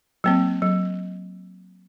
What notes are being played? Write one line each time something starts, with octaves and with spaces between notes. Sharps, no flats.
F#3 A#3 C4
F#3